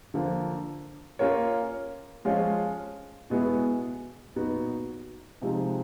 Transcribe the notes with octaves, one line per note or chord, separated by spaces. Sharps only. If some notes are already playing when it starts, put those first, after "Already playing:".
D3 F3 A#3
A#3 C#4 F4 A#4 C#5
F3 G#3 C#4 F4
B2 G#3 B3 E4 G#4
A#2 F#3 B3 D#4 F#4
C3 F3 G#3 C4 D#4